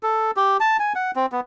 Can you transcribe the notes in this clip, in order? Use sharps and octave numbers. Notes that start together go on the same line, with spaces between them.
A4
G4
A5
G#5
F#5
C4
B3